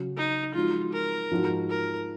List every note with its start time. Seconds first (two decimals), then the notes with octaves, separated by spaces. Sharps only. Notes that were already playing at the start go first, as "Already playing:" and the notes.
Already playing: C#3 F#3 C#4 F#4
0.17 D#4
0.55 F3 G#3 D#4 F4 F#4
0.93 A#4
1.31 G#2 F3 G#3 D#4 F#4
1.69 A#4